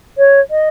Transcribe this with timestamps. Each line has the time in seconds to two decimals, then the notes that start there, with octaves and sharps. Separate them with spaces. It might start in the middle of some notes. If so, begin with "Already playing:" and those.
0.18 C#5
0.51 D#5